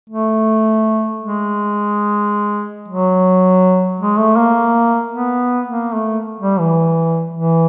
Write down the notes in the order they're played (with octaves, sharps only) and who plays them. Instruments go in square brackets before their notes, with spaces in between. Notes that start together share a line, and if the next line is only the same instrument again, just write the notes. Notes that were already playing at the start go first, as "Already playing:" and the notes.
[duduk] A3
G#3
F#3
G#3
A3
A#3
B3
A#3
A3
G3
E3
E3